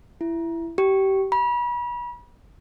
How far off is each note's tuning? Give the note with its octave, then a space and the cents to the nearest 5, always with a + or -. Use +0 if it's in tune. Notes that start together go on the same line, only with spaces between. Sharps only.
E4 +15
G4 -25
B5 -35